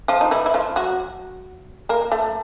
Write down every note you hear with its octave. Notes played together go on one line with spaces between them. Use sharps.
F3 F4
D#4
E3 E4
E4
F3 F4
F#3 F#4
A#3 A#4
A3 A4